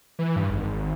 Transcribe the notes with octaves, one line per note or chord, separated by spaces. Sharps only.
E3
G2
G#1